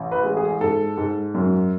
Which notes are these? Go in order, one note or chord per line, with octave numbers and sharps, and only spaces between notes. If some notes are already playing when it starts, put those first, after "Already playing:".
Already playing: A1
B4
G#3
G#4
G#2 A4
G#2
F#2